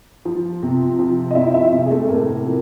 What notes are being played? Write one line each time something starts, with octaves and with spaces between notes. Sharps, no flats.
F3
C3
F3
D#5
C3 E4 E5
E4 E5
C3
G#4
A3 A4
A2 A#3 A#4
F3